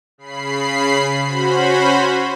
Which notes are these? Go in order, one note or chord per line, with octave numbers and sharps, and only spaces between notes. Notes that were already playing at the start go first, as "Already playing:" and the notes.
C#3 B5 C7
C#4 F#4 C5 B5